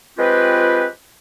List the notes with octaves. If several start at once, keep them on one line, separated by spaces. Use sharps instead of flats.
F3 G#3 C4 F4 G4 B4